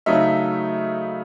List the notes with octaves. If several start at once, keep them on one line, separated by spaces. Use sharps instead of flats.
C#3 F#3 A3 D#4 E5